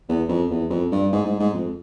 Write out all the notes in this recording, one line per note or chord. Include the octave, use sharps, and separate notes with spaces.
E2
F2
E2
F2
G2
G#2
G#2
G#2
F2